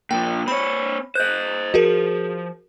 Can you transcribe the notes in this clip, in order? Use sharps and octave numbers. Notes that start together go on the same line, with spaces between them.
A#2 F3 G5
C4 C#5 B5
C5 D#5 F#6 G6
F3 F#4 G#4 A#4